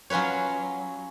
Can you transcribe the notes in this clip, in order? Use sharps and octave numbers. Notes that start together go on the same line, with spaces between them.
F#3 C#4 F4 B4 C#5